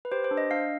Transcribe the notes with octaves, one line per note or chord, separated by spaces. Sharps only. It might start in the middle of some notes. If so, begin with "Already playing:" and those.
B4
G4 C5
C5
D4
D#5
D4 F5